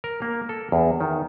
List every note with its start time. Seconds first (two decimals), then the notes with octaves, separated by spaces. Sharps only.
0.04 A#4
0.22 A#3
0.49 A4
0.72 E2
1.01 D#3